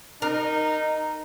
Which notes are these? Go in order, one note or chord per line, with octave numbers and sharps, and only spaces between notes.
D#4 A#4